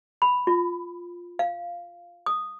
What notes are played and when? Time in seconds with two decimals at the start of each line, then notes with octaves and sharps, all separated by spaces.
0.22 B5
0.47 F4
1.39 F5
2.26 D#6